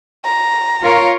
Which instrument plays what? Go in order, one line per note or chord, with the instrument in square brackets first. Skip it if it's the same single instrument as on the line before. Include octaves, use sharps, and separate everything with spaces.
[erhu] A#5
[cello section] F4 A#4 C#5